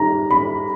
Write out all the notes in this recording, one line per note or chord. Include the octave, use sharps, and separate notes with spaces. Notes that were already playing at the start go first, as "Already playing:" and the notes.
Already playing: D#3 G3 A#5
B5